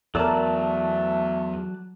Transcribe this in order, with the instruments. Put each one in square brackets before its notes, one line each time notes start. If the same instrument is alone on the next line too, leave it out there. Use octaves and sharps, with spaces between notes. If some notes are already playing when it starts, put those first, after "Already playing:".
[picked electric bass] E2 [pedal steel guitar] F#3 D5 A5 [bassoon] A3 [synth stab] A4 A#4